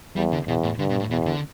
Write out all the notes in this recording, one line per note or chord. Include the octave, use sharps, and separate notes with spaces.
E2 G3
D3
E2 B2
A2
G2 D3
B2
A2
E2 B2
D3